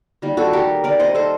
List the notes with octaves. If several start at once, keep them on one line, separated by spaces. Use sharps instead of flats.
D#3 G3 A#3
F#4 A4
G4 A#4
A#4 D5
C5 D#5
A4 C5